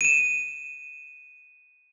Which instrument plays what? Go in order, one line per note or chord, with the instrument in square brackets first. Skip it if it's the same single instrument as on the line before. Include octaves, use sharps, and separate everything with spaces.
[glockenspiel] D#7 E7